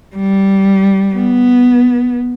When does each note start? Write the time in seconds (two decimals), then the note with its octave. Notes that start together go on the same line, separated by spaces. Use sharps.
0.16 G3
1.14 B3